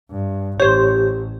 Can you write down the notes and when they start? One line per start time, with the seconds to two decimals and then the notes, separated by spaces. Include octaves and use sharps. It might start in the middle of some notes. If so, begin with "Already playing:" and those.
0.10 G2
0.60 A1 G4 C5 C#5